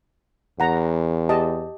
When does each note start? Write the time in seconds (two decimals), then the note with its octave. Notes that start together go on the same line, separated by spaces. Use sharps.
0.60 E2 F#5 A#5
1.29 G4 D#5 A5